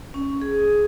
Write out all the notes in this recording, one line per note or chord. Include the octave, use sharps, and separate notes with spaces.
C#4
G#4